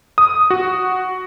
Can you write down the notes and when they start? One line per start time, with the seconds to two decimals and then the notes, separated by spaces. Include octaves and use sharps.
0.18 D#6
0.50 F#4